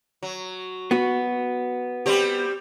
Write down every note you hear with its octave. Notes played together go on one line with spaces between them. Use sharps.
F#3
B3 F#4
G3 C4 G4